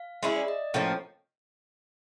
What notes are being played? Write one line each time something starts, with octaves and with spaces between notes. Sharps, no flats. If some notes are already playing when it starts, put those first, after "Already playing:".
Already playing: F5
G#3 C#4 E4 E5
D5
D#5
A2 F3 A#3 C#4